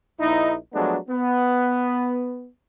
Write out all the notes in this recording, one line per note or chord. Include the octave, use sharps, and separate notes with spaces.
A#1 D#4 E4
F3 F#3 G#3 A3 B3 D4
B3